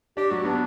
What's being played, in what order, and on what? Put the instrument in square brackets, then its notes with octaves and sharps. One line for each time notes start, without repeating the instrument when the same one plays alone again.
[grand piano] D4 [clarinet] G4
[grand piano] F#3 [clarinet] F#4
[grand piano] B3 [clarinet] D4